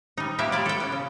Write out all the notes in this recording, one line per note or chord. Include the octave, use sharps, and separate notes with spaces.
G3 D#4
A#3 B3 F4 G4 E5
G3 E4 F4 D5
A4 G5
B3 C#4
C#3